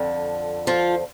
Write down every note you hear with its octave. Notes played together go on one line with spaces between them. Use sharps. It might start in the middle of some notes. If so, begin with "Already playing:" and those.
Already playing: F2 D3
F3 F4